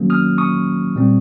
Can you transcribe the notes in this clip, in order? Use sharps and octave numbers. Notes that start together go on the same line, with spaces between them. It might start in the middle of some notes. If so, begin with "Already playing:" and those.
Already playing: D#3 F#3 A#3 C#4
D#6 F6
C#6 D#6
A#2 G3 C4